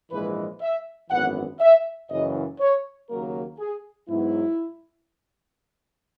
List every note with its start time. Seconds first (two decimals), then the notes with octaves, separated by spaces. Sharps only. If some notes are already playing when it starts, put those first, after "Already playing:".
0.11 A#1 G#2 E3 G#3 B4
0.61 E5
1.10 G#1 F#2 E3 B3 F#5
1.60 E5
2.10 F#1 F#2 C#3 E3 D#5
2.60 C#5
3.10 D#2 C#3 F#3 A#3 A#4
3.59 G#4
4.09 G#2 F#3 B3 E4